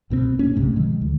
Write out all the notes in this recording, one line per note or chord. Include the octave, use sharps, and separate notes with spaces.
C2 B2 D3 C4
A#2 A#3 C#4
B1 G#2 C3 A3
B2 D#3 F3 G#3
D2